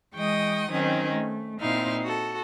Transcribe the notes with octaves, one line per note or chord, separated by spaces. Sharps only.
E3 G#3 D#5 G5 C#6 D#6
D#3 F#3 C4 C#4 D#4
A3
A#2 C4 D#4 E4 F5
F#4 A4